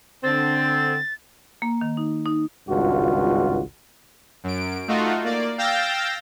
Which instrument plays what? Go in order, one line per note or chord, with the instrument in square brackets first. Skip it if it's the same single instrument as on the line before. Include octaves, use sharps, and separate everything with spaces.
[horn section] D3 C4 [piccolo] A6
[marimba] A#3
D#3
D#4
D#4
[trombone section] G#1 C#2 G2 F4 F#4
[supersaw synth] F#2 D7
A3 D#4 F4 F#4
A#3 D5
F5 G5 E6 G6 A6 A#6